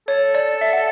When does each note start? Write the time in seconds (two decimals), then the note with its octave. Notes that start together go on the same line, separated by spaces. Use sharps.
0.08 A4 C#5
0.35 D5
0.61 E5
0.73 F#5